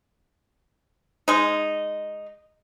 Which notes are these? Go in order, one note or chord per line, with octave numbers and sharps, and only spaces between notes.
G#3 D#4